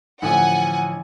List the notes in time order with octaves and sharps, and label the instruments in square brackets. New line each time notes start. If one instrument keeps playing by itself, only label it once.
[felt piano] A1 D3 F3 [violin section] F#5 G#5